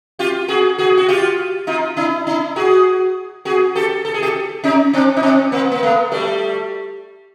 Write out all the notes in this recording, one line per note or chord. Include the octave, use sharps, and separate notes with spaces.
F4 G4
F#4 G#4
F#4 G#4
F#4
F4 G4
D#4 F4
D4 E4
D4 E4
F#4 G#4
F#4 G#4
G4 A4
A4
G#4
G4 A4
C#4 D#4
C4 D4
D#4
C4 D4
A#3 C4
A#3
A3 B3
G3 A3